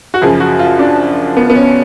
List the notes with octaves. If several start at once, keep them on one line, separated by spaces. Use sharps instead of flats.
F#4
F#2 C#3 F3 G#4
F#4
F4
D4
B3
B3
C#4